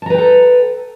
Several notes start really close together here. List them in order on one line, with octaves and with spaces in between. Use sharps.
A5 A#5 B4 G5 A4